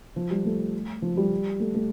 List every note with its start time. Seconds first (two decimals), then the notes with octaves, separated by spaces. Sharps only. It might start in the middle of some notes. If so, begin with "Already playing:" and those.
0.16 F3
0.30 G3
0.45 A3
1.02 F3
1.17 G3
1.60 A3
1.74 A3